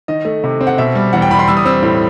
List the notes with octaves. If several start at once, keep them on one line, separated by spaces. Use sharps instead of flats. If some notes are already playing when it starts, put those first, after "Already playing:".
D#3 D#5
A3
C3
C4
F#5
B2 E5
G3
E2 F#5
G5
E2 B5
C6
G3 E6
D#6
C4 E6
A2